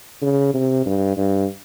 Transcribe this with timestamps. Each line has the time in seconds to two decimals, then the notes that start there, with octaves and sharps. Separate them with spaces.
0.22 C#3
0.54 C3
0.86 G2
1.17 G2